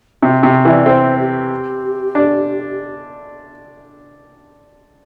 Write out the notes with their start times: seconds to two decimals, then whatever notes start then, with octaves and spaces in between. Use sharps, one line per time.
0.22 C3 F#4
0.43 C3 G4
0.65 E3 E5
0.70 D5
0.86 C4 C5
1.19 G4
2.15 D4